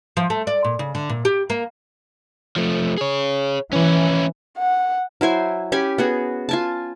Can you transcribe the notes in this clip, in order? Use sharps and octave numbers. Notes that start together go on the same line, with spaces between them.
F3
A3
D5
A#2
C#3
D3
A#2
G4
A#3
F3 A3
G#4 C#5
E3 C#4 E4
F#5
F#3 E4 C5 G#5
C#4 G4 G#5 B5
B3 F#4 G#4
F4 G#5 A5